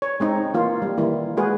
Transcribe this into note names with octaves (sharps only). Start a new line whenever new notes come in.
C#5
G#3 C4 D#4
E3 A#3 F4
G3
D#3 E3 G3 A#3 E4
G#3 F#4 G#4 B4